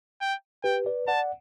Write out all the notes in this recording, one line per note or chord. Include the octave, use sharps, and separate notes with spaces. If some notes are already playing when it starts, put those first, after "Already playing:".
G5
G4 B4 G5
B4 D5
D5 F#5 A5